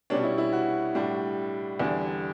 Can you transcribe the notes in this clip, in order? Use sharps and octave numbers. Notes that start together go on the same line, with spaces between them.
B2 G3 C#4 D4
E4
E4
F#4
A2 G3 D4
E2 D3 G3